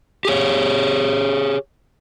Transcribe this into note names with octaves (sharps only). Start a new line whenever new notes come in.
G4 G#4 C#5